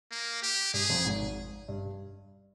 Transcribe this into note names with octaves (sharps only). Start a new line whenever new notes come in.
A#3
G4
G2 G3 G#4
F2 F3
G#1 G#2
G2